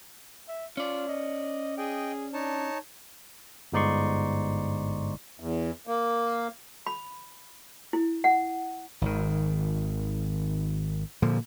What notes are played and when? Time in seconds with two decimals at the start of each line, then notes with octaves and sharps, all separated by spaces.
0.48 E5
0.77 C#4 F4 D5
1.08 D#5
1.78 G#4 D#5 G5
2.34 D4 D#4 C#5 A5
3.72 G1 G#2 D#4 D5 C6 C#6
5.40 E2
5.87 A#3
6.87 B5
7.93 E4
8.24 F#5
9.01 G#1 D#3
11.22 A#2 D3 F3